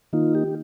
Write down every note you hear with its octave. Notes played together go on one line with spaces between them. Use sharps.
D#3 A#3 D#4 F4
G4